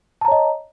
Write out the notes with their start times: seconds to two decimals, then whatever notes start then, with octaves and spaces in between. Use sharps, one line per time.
0.21 A5
0.25 A#5
0.28 C#5
0.32 D#5